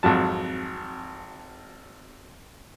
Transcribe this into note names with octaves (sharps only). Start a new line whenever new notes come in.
G#1 F2 F#3 A5